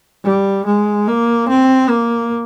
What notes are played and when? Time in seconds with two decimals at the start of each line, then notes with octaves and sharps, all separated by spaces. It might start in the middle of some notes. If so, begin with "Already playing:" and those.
0.24 G3
0.66 G#3
1.08 A#3
1.48 C4
1.89 A#3